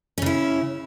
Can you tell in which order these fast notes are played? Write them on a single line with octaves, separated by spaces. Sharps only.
C#4 C#3 E4